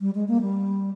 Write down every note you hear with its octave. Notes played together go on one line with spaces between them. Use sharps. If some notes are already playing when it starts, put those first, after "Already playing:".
G3
G#3
A#3
G3